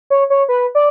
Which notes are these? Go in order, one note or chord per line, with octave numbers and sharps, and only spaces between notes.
C#5
C#5
B4
D5